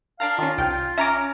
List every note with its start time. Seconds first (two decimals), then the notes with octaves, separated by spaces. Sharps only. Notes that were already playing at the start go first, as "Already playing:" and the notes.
0.20 D4 F5 A5 A#5 F6
0.38 D#3 C#4 F4
0.58 C2 F5 G5
0.98 C#4 E5 A#5 D6